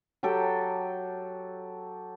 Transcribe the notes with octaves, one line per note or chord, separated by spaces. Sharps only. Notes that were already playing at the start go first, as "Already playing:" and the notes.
F#3 G4 A4 G5